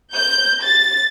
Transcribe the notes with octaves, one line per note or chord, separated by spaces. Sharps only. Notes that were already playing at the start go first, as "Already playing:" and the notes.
G6
A6